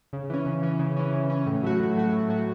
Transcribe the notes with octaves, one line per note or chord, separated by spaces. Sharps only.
C#3
E3 C#4
C#3
E3 C#4
C#3
E3 C#4
C#3
E3 C#4
A2
F#3 A3 F#4
A2
F#3 A3 F#4
A2
F#3 A3 F#4